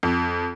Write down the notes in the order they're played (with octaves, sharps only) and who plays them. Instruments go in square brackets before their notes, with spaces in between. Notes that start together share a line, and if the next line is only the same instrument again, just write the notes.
[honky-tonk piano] F2